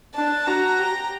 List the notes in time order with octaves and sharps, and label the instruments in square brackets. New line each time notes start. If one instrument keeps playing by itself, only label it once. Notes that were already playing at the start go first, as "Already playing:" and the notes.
[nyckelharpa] D4 [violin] A5
[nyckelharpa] F#4 [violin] A#5
[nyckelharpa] G4